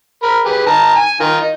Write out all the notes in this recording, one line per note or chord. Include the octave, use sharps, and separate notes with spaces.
A#4 B5
G4 G#4 B4
D#3 A5 A#5
G#5
D#3 F4 A#4
D#4